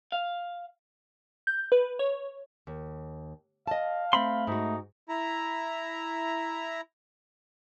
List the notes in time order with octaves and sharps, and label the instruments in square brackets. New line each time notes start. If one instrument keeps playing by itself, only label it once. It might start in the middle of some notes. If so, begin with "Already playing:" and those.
[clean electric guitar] F5
[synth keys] G6
B4
C#5
[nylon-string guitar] D#2
[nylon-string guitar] D#5 A5 [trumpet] F5
[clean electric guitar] A3 B5 C6 [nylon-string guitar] C4
[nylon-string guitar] G#2 F#4 [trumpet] D#4
[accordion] E4 A#5